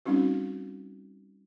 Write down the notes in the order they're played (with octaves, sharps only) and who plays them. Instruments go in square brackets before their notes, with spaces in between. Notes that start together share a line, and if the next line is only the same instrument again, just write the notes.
[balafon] G3 C4 C#4 D#4 F#4